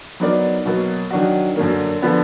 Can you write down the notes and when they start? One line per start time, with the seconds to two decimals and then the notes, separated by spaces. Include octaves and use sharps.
0.20 F#3 B3 D#4 A#4 D5
0.65 B2 F#3 A#3
1.11 D#3 F#3 D4 F#4
1.56 F#2 D3 F#3 A#3
2.02 D3 F3 B3